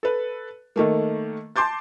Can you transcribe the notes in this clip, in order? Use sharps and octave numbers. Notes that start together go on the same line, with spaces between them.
A4 B4
D#3 A3 A#3
A5 C6 D6 G6 A6